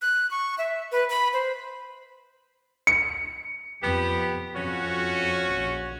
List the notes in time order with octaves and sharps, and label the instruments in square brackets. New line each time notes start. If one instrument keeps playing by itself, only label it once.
[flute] F#6
C#6
E5
B4
B5
C5
[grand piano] C#7
[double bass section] F2 [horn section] B3 G4
[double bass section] F2 [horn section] C#4 F#4
[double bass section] A#1